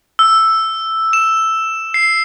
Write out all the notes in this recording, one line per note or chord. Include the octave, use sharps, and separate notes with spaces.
E6
E7
C7